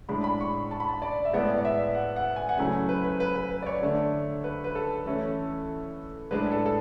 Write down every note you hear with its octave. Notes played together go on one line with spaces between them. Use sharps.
A2 G#3 D4 B5
B5
C#6
A5
B5
A5
D5
E5
A2 G#3 B3 D5
D5
E5
F#5
F#5
G#5
F#5
C#3 F#3 A3 E4 G#5
B4
B4
B4
B4
B4
D5
C#5
D3 A3 D4
B4
B4
A4
E3 A3 C#4 E4
A2 G#3 D4 B4
A4
A4